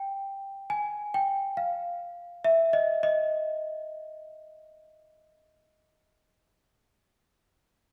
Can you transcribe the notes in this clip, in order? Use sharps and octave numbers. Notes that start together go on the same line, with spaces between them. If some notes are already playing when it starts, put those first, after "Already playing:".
Already playing: G5
G#5
G5
F5
E5
D#5
D#5